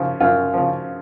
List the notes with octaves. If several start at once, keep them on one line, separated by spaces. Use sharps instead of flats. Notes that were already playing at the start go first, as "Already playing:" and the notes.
Already playing: F#2 C#3 F3
F#2 F4
C#3 F3